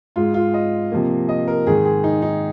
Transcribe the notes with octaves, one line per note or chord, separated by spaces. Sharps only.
G#2 G#3 F4
F4
D#5
C3 F3 A#3
D#5
A#4
G#2 D#3 G#3 G#4
G#4
D#4
D#4